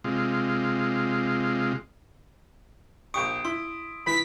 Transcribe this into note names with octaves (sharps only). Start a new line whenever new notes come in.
C3 G#3 F4
A#1 G4 C#6 D#6 D7
E4 C6
E3 B5 B6